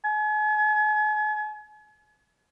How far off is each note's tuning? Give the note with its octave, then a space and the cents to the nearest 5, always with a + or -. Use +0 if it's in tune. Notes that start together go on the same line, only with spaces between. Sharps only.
G#5 +40